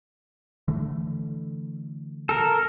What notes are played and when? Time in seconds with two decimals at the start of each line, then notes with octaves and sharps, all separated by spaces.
0.68 D3 E3 A3
2.29 A4 A#4